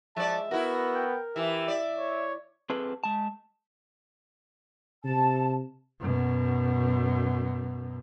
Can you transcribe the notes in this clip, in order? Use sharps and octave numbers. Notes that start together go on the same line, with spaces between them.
F3 G#3 D5 E5 A5
B3 E4 F#4 A#4
G5
E3 G4 E5
D5
C#5
C4 G#4 A4 B4
G#3 A5
C3 A5
F#2 B2